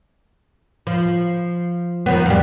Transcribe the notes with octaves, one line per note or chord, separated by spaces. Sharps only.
F3
D#3 F3 B3
F2 G3